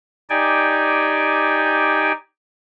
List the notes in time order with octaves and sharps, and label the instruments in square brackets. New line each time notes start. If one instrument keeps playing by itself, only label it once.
[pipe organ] D#4 G4 D5 G5 G#5